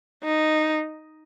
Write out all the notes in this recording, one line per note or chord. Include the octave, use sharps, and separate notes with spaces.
D#4